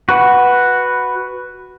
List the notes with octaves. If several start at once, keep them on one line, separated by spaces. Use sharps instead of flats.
F#4 B4 F#5